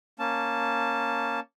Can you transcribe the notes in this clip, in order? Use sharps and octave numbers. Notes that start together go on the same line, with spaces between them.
A#3 C#4 A5